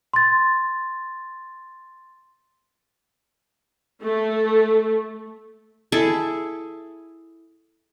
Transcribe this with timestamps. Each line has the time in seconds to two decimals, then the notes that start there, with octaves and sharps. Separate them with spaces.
0.13 C6 A6
4.03 A3
5.92 E4 G#4 A4